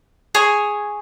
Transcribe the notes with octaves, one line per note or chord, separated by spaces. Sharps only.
G#4 C#5 G#5